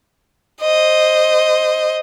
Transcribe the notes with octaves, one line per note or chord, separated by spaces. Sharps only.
C5 D#5